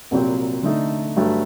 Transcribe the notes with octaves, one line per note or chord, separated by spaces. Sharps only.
C2 A#2 F#3 C4 G4
D3 A3 D#4
G2 F#3 A3